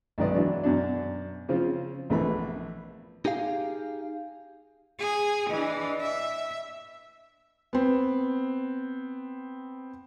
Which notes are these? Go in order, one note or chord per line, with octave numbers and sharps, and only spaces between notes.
B1 G#2 D#3 B4 D5 D#5
E3 F#3 D4
F#2 B2 D4
C#3 F3 C4 F4
A#1 E3 A3 B3 B5
D#4 G4 G#4 F5
G#4
E3 D4 D#5
E5
B3 C4